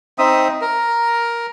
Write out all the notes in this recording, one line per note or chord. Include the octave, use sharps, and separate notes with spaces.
C4 D#4 E5 D#6
A#4